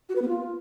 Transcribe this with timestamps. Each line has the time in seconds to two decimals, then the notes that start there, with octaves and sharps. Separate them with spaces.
0.09 F#4
0.16 B4
0.22 B3
0.28 F4